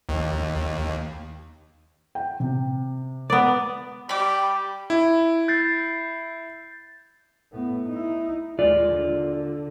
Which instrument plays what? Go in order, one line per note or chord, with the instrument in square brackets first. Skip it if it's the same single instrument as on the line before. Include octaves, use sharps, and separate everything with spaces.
[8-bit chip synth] D#2
[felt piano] G5
C3
[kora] B3 D5
[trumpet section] G3 G4 G5 [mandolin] B5 D6
[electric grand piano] E4
[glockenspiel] G6 A6 C7
[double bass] A2 B3
D#4 E4
[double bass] D#2 G#3 [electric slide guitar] F4 D5
[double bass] D3